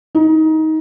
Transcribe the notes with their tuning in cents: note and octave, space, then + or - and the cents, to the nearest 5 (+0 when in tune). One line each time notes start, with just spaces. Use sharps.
D#4 +20